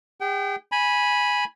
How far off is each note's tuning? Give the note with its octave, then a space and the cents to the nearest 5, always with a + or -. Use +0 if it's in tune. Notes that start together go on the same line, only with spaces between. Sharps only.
G#4 -45 G5 -30
G#5 +0 B5 -10